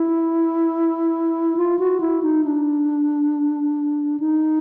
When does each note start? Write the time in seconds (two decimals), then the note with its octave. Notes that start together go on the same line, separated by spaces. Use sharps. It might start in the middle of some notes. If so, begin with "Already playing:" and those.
Already playing: E4
1.57 F4
1.79 F#4
2.00 E4
2.23 D#4
2.45 D4
4.20 D#4